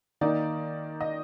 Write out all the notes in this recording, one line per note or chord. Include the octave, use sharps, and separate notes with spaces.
D#3 A#3 D#4 D5
D#5